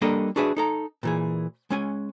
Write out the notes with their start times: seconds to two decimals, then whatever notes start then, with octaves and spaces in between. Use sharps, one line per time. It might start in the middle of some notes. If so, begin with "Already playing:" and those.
0.02 G3 A#3 D4 A4 D#5
0.36 D4 F#4 G#4 B4 E5
0.57 D#4 A4 A#5
1.03 A#2 E3 G#4
1.70 G#3 C#4 G#5